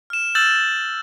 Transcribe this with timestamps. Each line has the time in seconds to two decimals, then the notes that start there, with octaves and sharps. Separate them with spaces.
0.10 F6 E7
0.35 E6 F6 G6 A6 E7 F#7